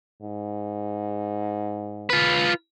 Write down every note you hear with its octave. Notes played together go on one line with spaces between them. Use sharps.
G#2
F4 B4